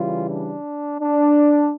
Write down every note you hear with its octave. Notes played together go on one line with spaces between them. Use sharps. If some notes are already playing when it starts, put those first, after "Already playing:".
Already playing: C#3 E3 G3 F4
D4
D4